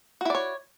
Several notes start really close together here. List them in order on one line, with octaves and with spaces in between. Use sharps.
F#4 E4 D5 C#5